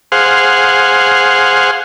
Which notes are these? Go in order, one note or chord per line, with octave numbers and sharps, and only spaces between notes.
G#4 C5 F5 F#5